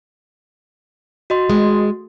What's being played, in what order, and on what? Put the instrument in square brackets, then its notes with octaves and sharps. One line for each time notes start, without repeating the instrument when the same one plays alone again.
[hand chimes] F#4 D#5 C6
[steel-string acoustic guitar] G#3